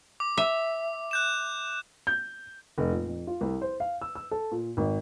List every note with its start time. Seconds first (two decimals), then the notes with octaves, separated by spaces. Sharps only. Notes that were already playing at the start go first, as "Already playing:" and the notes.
0.20 D6
0.37 E5
1.11 F#6 G6 E7
2.07 G6
2.78 F1
2.91 A#2
3.08 F2
3.27 F4
3.41 C2
3.62 C5
3.80 F5
4.01 E6
4.15 E6
4.31 A4
4.51 A#2
4.77 G#1